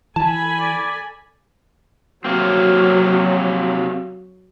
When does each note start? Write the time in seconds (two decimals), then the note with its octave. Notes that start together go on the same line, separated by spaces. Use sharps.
0.16 E3 A4 G#5 A5 B5
0.60 D5
2.25 C3 F#3 A#3 C4